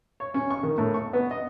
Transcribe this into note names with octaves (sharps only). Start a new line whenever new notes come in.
C#5
C#4
C#6
D#3
A2
C#6
B3
D#5